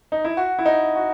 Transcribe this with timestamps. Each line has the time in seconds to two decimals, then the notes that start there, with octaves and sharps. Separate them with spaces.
0.12 D#4
0.24 E4
0.37 F#4
0.59 E4
0.65 D#4
0.95 F#4